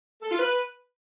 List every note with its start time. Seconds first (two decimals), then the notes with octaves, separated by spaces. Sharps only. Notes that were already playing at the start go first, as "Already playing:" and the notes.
0.22 A4
0.31 F4
0.39 B4